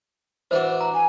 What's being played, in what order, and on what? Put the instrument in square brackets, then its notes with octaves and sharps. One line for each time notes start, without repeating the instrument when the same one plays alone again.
[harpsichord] E3 D4 F#4 [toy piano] C5
[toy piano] A#5
[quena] G#5